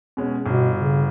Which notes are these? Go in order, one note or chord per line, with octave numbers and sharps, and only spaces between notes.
B2 G#3 C#4
G1 B2
C#3